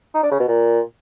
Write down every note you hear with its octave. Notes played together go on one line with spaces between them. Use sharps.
D#4
D4
C#3
B2
A#2